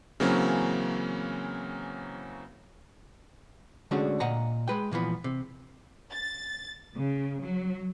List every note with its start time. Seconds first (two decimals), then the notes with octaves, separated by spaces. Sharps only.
0.20 C#3 E3 F#3 A#3 C4 C#4
3.91 D3 G#3 A3 C#4 D4 F#4
4.20 A#2 D#5 F#5 A#5
4.68 G#3 B4 G5
4.91 A#2 E3 F3 B3
5.24 C3
6.11 A6
6.94 C#3
7.41 F#3